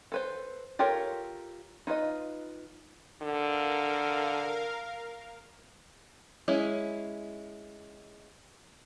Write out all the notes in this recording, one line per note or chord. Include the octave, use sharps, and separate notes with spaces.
A4 B4 C5
F4 G4 A4 A#4 C#5
D#4 F4 B4 D#5
D3 A#4 F5
G#3 C#4 E4